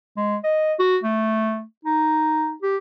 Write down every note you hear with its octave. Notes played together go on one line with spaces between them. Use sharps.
G#3
D#5
F#4
A3
D#4
G4